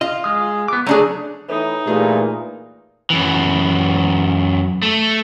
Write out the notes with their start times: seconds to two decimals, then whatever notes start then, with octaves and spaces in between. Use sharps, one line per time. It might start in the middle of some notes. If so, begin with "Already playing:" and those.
0.01 F4 D#5
0.24 G#3 D#6
0.68 B3 D6
0.86 F#3 A3 D4 G#4 C#5 A#5
1.49 A2 E3 D#4
1.87 G2 A#2 E3 A3 G#4
3.10 F#2 E3
4.83 A3